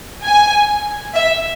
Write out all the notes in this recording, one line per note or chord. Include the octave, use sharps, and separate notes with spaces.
G#5
E5